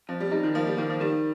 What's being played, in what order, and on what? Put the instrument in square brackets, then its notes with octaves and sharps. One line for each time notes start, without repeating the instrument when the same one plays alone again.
[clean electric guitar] F2 [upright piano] F3
[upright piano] G3
[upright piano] G3 [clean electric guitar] D#4
[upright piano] D#3
[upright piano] F3 [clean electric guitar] A#3
[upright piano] G3
[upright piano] D#3 [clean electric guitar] A#3
[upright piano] F3
[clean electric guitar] D#3 [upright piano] G3